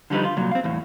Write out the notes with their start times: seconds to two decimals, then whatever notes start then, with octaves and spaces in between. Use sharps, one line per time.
0.10 D3 F3 G3 D#4 B4
0.24 F4
0.37 C2 A#2 F#3
0.51 C4 F5
0.64 E2 A2